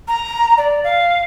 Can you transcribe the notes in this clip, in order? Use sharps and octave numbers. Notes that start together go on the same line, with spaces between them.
A#5
D5
F5